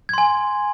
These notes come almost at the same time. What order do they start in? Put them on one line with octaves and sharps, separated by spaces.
G#6 C6 G#5